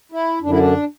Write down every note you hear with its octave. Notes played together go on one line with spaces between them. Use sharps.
E4
F#2 D3 D4 E4
D4